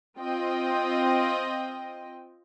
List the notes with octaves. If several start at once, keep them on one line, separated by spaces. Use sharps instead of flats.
C4 F4 D#5 G5